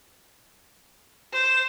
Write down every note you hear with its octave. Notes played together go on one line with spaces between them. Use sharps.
C5 E7